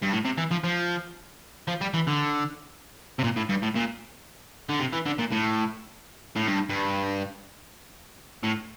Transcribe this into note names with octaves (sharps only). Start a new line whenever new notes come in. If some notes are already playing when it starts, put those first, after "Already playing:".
G2
A2
C3
E3
F3
F3
F3
G3
E3
D3
C3
A#2
A2
G2
A2
A#2
D3
C3
E3
D3
A#2
A2
A2
G2
G2
A2